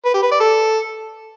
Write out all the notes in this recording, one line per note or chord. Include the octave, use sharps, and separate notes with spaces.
B4
G4
B4
D5
A4